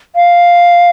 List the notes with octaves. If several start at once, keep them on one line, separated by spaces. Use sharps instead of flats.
F5